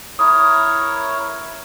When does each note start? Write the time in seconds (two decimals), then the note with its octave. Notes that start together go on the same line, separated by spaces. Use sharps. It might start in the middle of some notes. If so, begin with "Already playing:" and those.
0.19 E4 A#4 C#5 D#6